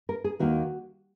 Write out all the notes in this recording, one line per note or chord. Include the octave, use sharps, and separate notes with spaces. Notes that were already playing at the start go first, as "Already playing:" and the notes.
A#4
G#4
D#2 D#3 A#3 F#4